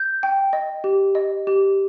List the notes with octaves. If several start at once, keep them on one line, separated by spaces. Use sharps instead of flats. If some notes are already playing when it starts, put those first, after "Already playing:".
Already playing: G6
G5
D#5
G4
D#5
G4